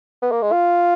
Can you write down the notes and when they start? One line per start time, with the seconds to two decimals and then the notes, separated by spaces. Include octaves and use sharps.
0.22 B3
0.32 A#3
0.42 G#3
0.52 F4